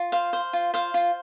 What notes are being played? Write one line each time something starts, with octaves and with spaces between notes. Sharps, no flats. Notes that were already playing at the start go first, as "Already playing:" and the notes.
Already playing: F4
C5 F5
C5
F4
C5 F5
F4